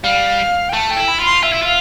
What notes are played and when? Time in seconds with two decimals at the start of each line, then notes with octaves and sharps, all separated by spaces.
0.03 G3 F5
0.69 G5
0.73 A3 A5
0.91 G5
0.96 E4
1.08 B5
1.19 F4
1.25 C6
1.43 F4 E5
1.53 E4
1.62 F4 F5